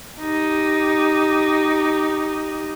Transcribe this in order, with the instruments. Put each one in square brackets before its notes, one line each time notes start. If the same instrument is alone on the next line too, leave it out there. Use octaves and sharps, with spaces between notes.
[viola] D#4 G4